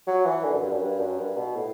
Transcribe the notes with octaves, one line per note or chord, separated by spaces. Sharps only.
F#3
E3
D3
F#2
G2
F#2
G2
F#2
G2
B2
A2